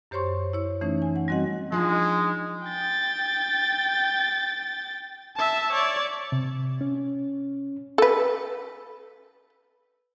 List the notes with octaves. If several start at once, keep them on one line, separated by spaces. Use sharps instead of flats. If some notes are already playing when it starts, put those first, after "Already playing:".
F#2 G4 C5 C#5 C6 C#6
E4 C#5
E3 A3 C#4 D#4
G#5
F#5
G3 C4 F#4 D#5 F#5
F3 G#3 D4 D#4
G5 A6
E5 A5
C#5 D5
C3
C#4
A4 B4